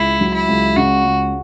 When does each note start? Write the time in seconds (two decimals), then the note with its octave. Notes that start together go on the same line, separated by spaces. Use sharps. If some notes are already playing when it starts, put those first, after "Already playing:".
Already playing: C#2 E4
0.21 F#3
0.34 E4
0.48 C#2
0.77 C#3 F#4
1.05 C#2